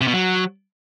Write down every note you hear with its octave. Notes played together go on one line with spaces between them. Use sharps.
C3
B2
F#3